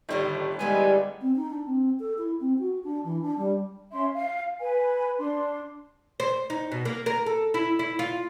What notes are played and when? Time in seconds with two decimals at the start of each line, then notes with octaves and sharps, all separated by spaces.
0.09 G1 A2 D#3 G3 A3
0.59 E3 G3 G#3 B3 G4 G#5
1.21 C4
1.36 D#4
1.50 D4
1.66 C4
2.00 A4
2.18 E4
2.40 C4
2.59 F#4
2.84 D4
3.04 E3
3.21 D4
3.38 G3
3.92 C#4 E5 C6
4.13 F5
4.60 B4 G#5
5.19 D4 C6
6.20 C5
6.50 D#4
6.72 B2
6.85 A#3
7.06 A#4
7.26 A4
7.54 E4
7.79 E4
7.99 F4